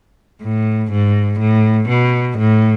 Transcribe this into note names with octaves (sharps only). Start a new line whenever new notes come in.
A2
G#2
A2
B2
A2